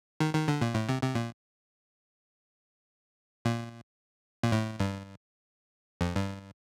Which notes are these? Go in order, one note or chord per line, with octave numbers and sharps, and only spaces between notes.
D#3
D#3
D3
A#2
A2
C3
C3
A#2
A#2
A#2
A2
G2
F2
G2